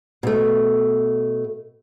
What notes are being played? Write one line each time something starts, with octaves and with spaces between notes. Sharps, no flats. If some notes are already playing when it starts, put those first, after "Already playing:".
B2 A3